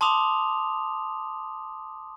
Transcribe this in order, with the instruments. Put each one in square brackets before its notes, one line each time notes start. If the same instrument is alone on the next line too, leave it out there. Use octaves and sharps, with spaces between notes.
[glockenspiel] A5 C6 D6 D#6 F7